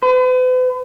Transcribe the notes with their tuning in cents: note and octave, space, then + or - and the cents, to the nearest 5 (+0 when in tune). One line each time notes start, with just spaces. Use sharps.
B4 +45